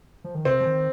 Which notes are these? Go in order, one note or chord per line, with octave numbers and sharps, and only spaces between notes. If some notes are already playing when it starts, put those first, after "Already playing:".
F3
D#3
C3 C4
F3
D#3